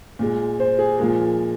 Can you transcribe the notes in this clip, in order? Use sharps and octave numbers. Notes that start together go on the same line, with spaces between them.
A#2 G#3
C5
G#4
A#2 F3 G#3 A#4